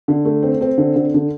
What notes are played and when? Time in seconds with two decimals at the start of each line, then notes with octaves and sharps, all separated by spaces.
0.08 D3
0.25 A3
0.42 C4
0.61 C4
0.78 D3
0.96 D3
1.14 D3